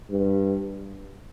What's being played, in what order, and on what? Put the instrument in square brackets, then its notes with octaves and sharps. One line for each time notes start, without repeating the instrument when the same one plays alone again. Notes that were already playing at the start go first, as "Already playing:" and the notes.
[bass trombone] G2